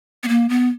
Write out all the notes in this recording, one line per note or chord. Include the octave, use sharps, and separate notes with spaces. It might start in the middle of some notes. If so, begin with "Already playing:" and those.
B3
A#3
B3